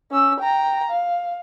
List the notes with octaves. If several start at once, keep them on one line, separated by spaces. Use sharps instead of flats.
C#4 E6
G5 A#5
F5